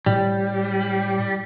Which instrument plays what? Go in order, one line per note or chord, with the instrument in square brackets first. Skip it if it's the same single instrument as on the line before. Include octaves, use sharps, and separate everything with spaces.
[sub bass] A2 [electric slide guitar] G3